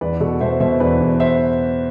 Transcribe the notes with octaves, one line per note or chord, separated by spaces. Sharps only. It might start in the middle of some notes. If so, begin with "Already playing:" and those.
E2 B4 D5
B2 F#4 A4
B2 C5 E5
B2 C5 E5
E2 B4 D5
E2
C5 E5